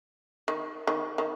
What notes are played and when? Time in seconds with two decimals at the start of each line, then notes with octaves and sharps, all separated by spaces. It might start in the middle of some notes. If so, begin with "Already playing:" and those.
0.48 D#3
0.87 D#3
1.18 D#3